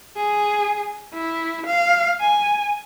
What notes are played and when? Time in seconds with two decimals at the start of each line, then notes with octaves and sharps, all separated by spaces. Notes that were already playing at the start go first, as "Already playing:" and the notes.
0.17 G#4
1.14 E4
1.66 F5
2.20 G#5